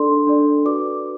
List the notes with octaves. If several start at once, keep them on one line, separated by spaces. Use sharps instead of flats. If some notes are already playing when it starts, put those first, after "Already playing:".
Already playing: D4 A4 D5 C6
D4 A4 D5
F#4 B4 D5 D6